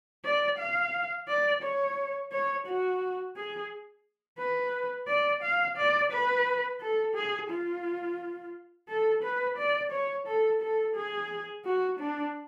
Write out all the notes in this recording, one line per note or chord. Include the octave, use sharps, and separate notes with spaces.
D5
F5
D5
C#5
C#5
F#4
G#4
B4
D5
F5
D5
B4
A4
G#4
F4
A4
B4
D5
C#5
A4
A4
G#4
F#4
D4